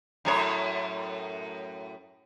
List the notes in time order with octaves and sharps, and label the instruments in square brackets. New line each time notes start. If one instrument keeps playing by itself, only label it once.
[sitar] F#2 A2 C#5